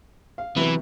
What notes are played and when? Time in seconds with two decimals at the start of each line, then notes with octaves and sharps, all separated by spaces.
0.38 F5
0.56 C3 E3 F#3 B3